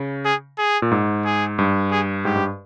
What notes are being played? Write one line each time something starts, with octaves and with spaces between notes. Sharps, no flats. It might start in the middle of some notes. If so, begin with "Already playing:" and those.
Already playing: C#3
G#4
G#4
A#2
G#2
G#4
G2
G#4
G#2 G4
G2